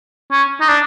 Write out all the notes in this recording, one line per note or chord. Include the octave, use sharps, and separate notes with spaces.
C#4
D#4
D4